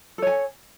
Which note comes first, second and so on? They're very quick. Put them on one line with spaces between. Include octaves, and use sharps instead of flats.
A4 C#5 G#5